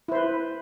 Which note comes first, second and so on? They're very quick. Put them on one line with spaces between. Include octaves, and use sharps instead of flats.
E4 C5 B4